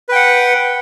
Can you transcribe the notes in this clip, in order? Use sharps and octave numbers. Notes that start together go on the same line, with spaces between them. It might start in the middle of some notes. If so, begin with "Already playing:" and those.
B4 F#5 G5